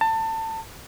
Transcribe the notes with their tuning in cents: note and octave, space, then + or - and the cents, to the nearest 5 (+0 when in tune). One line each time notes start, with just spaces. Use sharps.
A5 +25